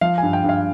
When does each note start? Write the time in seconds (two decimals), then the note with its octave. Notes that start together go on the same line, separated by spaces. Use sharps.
0.01 F3 F5
0.18 G2 G#5
0.33 G5
0.44 G2
0.49 F5